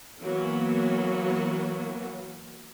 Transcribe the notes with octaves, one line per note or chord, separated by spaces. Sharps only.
E3 F#3 A#3 B3 F#4